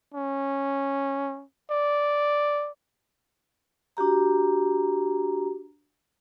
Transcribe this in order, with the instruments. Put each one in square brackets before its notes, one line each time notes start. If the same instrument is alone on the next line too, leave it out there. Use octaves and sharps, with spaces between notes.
[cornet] C#4
D5
[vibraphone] D4 F#4 G4 A#5